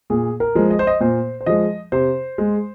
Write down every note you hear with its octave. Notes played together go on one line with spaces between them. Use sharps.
A#2 G#4
A#4
F3 G#3
D#5
C5
D#5
A#2 C5
C5
F3 G#3 D#5
C3 C5
G#3